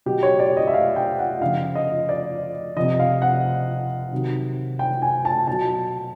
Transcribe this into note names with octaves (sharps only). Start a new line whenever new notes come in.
B2 F#3 G4
C#5
D5
D#5
E5
F5
G5
F#5
C#3 F3 F5
D#5
D5
C3 F3 D#5
F5
F#5
C3 D#3 F#3
G5
G#5
A5
B2 F#3 A5